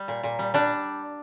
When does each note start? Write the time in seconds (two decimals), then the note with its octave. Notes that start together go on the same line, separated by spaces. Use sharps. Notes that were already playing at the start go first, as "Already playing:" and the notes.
Already playing: G3
0.08 A#2
0.23 A#2
0.39 G3
0.54 G3 D4